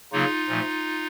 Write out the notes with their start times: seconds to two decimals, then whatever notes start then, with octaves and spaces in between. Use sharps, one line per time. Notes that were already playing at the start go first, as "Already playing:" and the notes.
0.12 C#3 F#3 A#3 D#4 F4
0.48 A#2 F3 A3